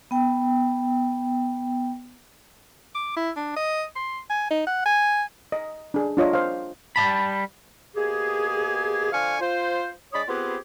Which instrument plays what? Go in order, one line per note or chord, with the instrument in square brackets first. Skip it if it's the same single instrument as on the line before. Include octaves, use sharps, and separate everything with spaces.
[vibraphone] B3 G5
[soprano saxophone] D6
E4
D4
D#5
C6
G#5
D#4
F#5
G#5
[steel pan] D#5
D4 G#4
D4 F4 C#5 D#5
C5 F5
[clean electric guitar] G3 D#5 A5 B5
[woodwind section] B2 A#3 G4 G#4
D3 F3 F5 G#5 C#6 F6
F4 C5
G#3 D4 C#5 D5 B5 D#6
B3 C4 F4 G4 G#4 B4